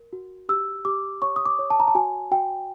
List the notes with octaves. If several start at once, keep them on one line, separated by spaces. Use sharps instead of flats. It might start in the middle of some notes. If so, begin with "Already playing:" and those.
Already playing: A#4
F#4
G4 E6
G4 D6
C#5 C#6
D#6
D6
C#5
A5
A#5
A5
F#4 G#5
F#4 G5